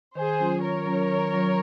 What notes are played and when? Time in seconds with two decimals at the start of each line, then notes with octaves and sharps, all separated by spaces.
0.15 D#3 G#4 C5
0.40 F#3 C#4 F4
0.62 D#3 A#4 C#5
0.86 F#3 C#4 F4
1.09 D#3
1.32 F#3 C#4 F4